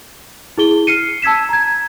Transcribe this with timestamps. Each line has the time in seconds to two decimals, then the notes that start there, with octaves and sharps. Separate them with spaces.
0.58 E4 G#4 G7
0.87 F6 C7 C#7 D#7
1.22 A5 E6 G#6 B6 E7
1.49 A#5 G#6